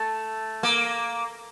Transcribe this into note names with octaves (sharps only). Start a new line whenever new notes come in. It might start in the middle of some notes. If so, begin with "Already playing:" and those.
Already playing: A3
A#3